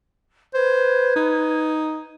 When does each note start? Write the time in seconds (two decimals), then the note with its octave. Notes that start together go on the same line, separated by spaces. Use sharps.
0.54 B4 C5 G#6
1.16 D#4